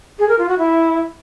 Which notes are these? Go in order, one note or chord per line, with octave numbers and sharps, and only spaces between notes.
G#4
A#4
F4
F#4
E4